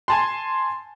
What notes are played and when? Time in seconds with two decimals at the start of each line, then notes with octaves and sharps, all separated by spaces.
0.08 G#5 A5 C6